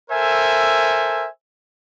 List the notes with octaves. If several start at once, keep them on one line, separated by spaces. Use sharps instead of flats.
A4 A#4 C5 E5 G#5